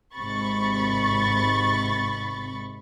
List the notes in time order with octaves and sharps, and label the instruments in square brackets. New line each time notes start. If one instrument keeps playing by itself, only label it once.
[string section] G#1 G#2 C3 B5 C#6 A6